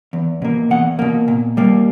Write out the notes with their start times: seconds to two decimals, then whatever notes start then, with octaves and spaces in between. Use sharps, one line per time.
0.13 E2
0.42 B2 A#3
0.71 E2 F#5
0.99 B2 A#3
1.28 A#2
1.57 G3 A#3